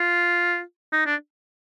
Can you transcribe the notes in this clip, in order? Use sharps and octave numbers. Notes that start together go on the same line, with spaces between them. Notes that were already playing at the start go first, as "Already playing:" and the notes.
Already playing: F4
D#4
D4